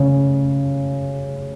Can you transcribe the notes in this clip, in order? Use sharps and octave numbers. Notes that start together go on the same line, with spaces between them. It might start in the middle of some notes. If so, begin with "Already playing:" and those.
Already playing: C#3 C#4